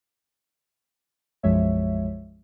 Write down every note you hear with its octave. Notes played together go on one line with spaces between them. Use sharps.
B1 F#2 F3 G#3 C#5 E5